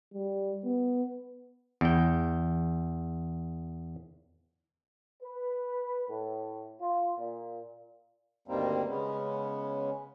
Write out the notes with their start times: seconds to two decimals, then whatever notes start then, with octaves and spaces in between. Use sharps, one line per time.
0.14 G3
0.65 B3
1.81 E2 G5
5.23 B4
6.08 A2
6.81 F4
7.18 A#2
8.48 D2 G2 D#3 G3 A#3 C4
8.87 C#3 G#3 B3 C#4